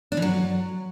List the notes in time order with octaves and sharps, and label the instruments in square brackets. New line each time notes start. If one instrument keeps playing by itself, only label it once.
[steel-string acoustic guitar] D4
E3
F#3